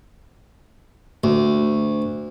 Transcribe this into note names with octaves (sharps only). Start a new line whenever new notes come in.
D2